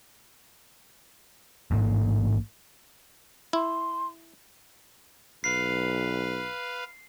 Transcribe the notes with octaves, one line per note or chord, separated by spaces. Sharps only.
A1 G#2 A#3
E4 C6
B1 B4 F5 C7